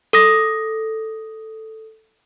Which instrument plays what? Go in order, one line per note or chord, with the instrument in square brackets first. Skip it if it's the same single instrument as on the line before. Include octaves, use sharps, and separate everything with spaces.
[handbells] A4 D#6 A#6